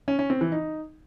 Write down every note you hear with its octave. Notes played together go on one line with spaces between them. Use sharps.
C#4
C#4
C4
E3
D#4